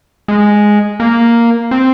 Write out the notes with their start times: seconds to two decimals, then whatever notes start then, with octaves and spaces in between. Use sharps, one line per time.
0.28 G#3
1.00 A#3
1.71 C4